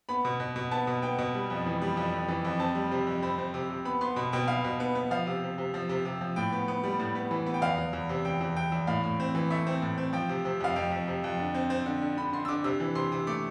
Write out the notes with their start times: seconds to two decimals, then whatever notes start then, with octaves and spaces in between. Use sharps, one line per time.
0.09 B3 B5
0.25 B2
0.40 B2
0.56 B2
0.71 B3 A5
0.87 B2
1.02 B3 G5
1.18 B2
1.34 G3
1.50 F2
1.66 E3
1.82 G3
1.97 F2
2.13 F2
2.28 E3
2.45 F2
2.60 C4 A5
2.75 G3
2.91 C3
3.07 F2
3.22 C4 B5
3.38 C4
3.54 C3
3.70 C3
3.85 B3 B5
4.01 B3 C6
4.16 B2 B5
4.33 B2 G5
4.48 B3 F5
4.64 B2
4.80 B3
4.95 B3
5.11 F3 F5
5.27 C3
5.43 C3
5.58 C3
5.74 F3
5.89 C3
6.05 C3
6.21 F3
6.36 A2 G5
6.52 B3
6.68 B3
6.84 G3
6.99 A2
7.15 B3
7.31 E3
7.46 B3
7.54 G5
7.62 E2 F5
7.78 E2
7.93 E2
8.09 C3
8.25 E2 G5
8.41 E2
8.56 E2 G5
8.72 E2
8.87 A2 F5
9.03 A2
9.20 C4
9.35 E3
9.50 A3 E5
9.67 C4
9.82 A2
9.98 C4
10.13 F3 G5
10.29 C3
10.45 C3
10.60 F2 F5
10.76 F2 G5
10.91 F2
11.08 C3
11.24 F2
11.39 D3
11.54 C4
11.70 C4
11.86 D3
12.02 D3
12.17 D3 B5
12.33 D3 C6
12.45 E6
12.48 D3 D6
12.64 C3 E6
12.80 E3
12.95 C3 C6
13.12 C3
13.27 A3 D6